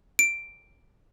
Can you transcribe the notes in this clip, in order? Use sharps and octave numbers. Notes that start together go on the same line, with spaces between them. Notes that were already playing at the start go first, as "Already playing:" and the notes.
D7